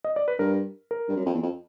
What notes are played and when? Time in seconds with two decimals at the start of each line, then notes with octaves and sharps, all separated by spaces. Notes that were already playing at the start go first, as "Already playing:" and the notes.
0.04 D#5
0.16 D5
0.28 B4
0.39 G2 A#4
0.91 A#4
1.09 G2
1.16 F#2
1.26 F2
1.34 E2
1.43 F2